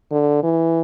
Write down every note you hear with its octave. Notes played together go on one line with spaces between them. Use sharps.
D3
E3